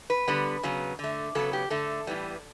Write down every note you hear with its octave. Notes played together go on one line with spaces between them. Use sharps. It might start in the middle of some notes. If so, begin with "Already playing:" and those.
B4
D3 G3 B3
C#3 F#3 B3
D3 A3
C#3 F#3 B3 A4
G4
D3 A3 A4
A2 E3 G3 B3